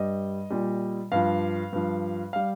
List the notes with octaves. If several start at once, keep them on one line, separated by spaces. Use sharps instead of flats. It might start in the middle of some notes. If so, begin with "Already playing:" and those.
Already playing: G2 G3 D#5
A#2 G3
G2 F3 F5
G2 F3
G3 F5